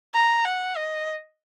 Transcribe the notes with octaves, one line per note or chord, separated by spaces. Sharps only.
A#5
F#5
D#5